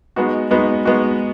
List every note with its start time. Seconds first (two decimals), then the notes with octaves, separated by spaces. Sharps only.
0.16 G#3 B3 D#4 F#4
0.51 G#3 B3 D#4 F#4
0.85 G#3 B3 D#4 F#4